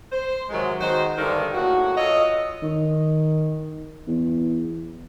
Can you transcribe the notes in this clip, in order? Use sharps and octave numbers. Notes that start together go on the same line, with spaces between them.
C5
G#2 C3 D#3 F#3 G#3
D#3 G#3 F#4 C5
G2 D3 D#3
A2 C#3 A#3 F#4
F4 A4 C#5 D#5
D#3
E2